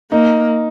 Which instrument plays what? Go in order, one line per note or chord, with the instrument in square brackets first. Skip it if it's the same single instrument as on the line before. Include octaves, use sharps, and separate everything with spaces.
[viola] A#3 [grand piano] D#4